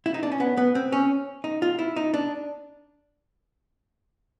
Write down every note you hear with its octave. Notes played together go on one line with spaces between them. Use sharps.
E4
D#4
D4
C#4
B3
B3
C4
C#4
D#4
F4
E4
D#4
D4